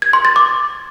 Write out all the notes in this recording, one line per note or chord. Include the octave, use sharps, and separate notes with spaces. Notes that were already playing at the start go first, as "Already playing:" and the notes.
G#6
C6
A6
D6